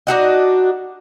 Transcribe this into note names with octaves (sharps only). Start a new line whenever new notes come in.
D4 D#4 F#4 D#5